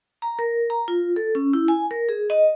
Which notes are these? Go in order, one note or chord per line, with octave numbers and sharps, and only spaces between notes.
A#5
A#4
A#5
F4
A4
C#4
E4
G#5
A#4
G#4
D#5